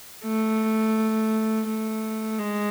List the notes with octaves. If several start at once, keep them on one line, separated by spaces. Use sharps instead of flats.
A3
A3
G#3